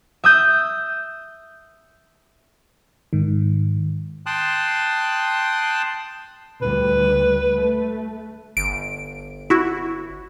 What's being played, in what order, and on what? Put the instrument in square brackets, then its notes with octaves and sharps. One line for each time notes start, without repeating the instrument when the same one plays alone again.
[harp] E5 D#6 G6
[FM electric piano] G#2 D#3
[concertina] G5 A5 C6 D#6 F#6
[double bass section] D2 G3 [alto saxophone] B4
[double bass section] A3
[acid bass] G1 [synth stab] D7
[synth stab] E4 F#4